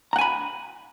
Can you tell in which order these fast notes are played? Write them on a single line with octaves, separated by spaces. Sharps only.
A#5 F#5 G#5 B5